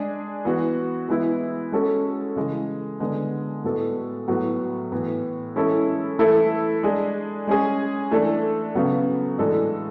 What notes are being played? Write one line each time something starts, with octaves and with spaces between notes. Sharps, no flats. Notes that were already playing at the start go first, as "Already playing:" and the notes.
Already playing: G#3 D4 G#4
E3 B3 F#4
E3 G#3 B3 E4
G#3 C#4 F#4 A4
C#3 E3 G#3
D3 G#3 B3
A2 G#3 B3 F#4 A4
A2 F#3 B3 F#4
A2 E3 B3
E3 G#3 C#4 E4 A4
E3 A3 E4 A4
G#3 D4 G#4
G#3 C#4 G#4
E3 A3 D4 A4
C#3 F#3 B3
A2 E3 G#3 D4 A4